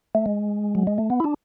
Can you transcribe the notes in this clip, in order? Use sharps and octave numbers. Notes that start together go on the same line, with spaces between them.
A3
G#3
F#3
G#3
A3
B3
E4
D4